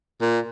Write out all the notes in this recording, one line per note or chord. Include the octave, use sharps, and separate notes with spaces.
A#2